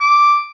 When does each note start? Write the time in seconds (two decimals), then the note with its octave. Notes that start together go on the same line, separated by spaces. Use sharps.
0.01 D6